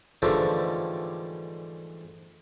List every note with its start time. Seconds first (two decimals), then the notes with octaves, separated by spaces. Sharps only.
0.22 G#2 D3 E3 F3 G3 A3